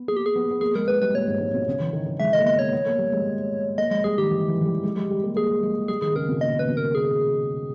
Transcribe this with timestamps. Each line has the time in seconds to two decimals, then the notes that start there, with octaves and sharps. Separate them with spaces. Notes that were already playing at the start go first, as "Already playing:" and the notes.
Already playing: B3
0.08 A#3 G#4
0.17 G4
0.26 G#4
0.36 B3
0.51 B3
0.61 A#3 G#4
0.75 G#3 A#4
0.88 G#3 B4
1.02 G3 B4
1.14 A#2 C#5
1.27 G#2
1.40 G#2
1.54 B2
1.68 C#3
1.80 E3
1.93 D#3
2.06 D#3
2.20 G#3 E5
2.33 D#5
2.38 A#3
2.46 B3 D#5
2.59 C#5
2.72 B3
2.86 A#3
2.98 G3
3.12 G#3
3.78 A#3 D#5
3.91 G#3 D#5
4.04 G3 G#4
4.18 D#3 G4
4.31 E3
4.48 E3
4.61 E3
4.65 G3
4.84 G#3
4.96 G#3
5.10 G3
5.23 A#3
5.36 A#3 G#4
5.63 G#3
5.88 G3 G#4
6.02 D#3 G#4
6.15 C#3 A#4
6.29 B2
6.41 A#2 D#5
6.59 C#3 B4
6.69 B2
6.77 A#4
6.95 G#4